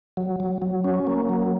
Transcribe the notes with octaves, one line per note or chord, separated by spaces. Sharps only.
F#3
F#3
F#3
C#4
A#3
F#3